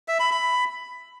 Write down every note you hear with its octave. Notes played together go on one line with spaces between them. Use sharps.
E5
B5
B5